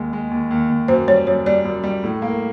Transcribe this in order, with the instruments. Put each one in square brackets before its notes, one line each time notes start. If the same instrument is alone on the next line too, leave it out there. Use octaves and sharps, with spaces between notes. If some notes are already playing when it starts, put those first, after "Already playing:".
Already playing: [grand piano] D#2 G#3
G#3
D#2
D#2
D#2
[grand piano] F#2 [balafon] C5
[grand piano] G3 [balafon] C#5
[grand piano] F#2 [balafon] C#5
[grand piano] G3 [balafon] D5
[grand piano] F#2
G3
A2
A#3